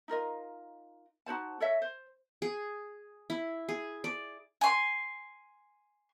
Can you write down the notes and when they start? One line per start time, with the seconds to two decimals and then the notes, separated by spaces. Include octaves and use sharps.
0.08 D#4 F4 A#4 D#5
1.26 D#4 F#4 C5 A5
1.60 A4 C#5 D#5 E5
1.82 C5
2.42 G#4
3.30 E4
3.69 G#4
4.04 D5
4.61 G#5 C6